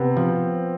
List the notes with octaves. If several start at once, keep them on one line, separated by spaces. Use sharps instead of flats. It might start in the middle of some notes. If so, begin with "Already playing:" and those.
Already playing: C3 B3 C4
F3